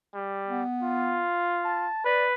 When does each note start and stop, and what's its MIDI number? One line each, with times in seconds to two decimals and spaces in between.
0.14 0.62 55
0.47 1.25 59
0.82 1.88 65
1.65 2.04 81
2.05 2.35 71
2.05 2.25 74